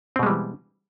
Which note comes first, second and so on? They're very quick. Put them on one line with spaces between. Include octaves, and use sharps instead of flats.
C4 B2 G#3 G3 E3